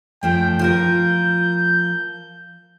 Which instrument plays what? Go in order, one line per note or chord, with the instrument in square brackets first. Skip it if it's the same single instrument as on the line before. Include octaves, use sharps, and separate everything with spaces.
[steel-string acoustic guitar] F#2 F3 A3 [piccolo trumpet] G5
[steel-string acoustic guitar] F3 F4 A#4 [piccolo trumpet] G6